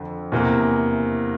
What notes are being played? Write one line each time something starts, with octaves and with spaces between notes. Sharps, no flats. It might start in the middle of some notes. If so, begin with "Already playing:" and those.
Already playing: F2 D3
E2 C3 E3 A#3 E4